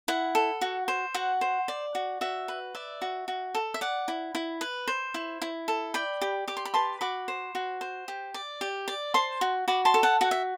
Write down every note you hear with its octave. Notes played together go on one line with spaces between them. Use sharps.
E4 F#5
A4
F#4
C5
F#4 F#5
C5
D5
F#4
F#4 E5
B4
D5 E5
F#4
F#4
A4
E5
D5 F#5
E4
E4
B4
C5
E4
E4
A4
D5 G5 B5
G4
G4 D6
C6
B5
B4 A5 C6
F#4 B5 D6
C5
F#4
C5
G4
D5
G4
D5
C5 A5 C6
F#4
F#4 B5 D6
A5 C6
A4
F#5 A5
F#4 F#5
E5